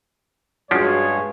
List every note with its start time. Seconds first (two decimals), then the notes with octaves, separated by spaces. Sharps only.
0.71 G2 F3 G#3 C#4 D4 F#4 G#4 C#5